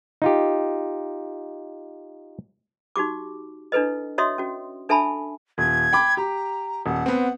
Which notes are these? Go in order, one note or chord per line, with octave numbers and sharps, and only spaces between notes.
D#4 F4 G4
D#4 F#4 G4 D6
D4 E4 A4 B4 D#5
F#4 C#5 D#5 E5 C6 D#6
C#4 F#4
D4 A4 E5 G#5 A5 B5
D#1 G#6
G5 B5 D6
G4 A#5
D#1 F#5
B3 C4